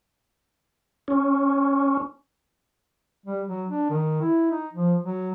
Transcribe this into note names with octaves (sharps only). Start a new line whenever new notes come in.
C#4
G3
F#3
D4
D#3
E4
D#4
F3
F#3